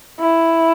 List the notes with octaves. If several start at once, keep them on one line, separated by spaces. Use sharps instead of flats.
E4